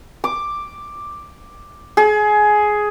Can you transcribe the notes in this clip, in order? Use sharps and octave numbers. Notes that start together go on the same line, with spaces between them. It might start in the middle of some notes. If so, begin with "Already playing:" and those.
D6
G#4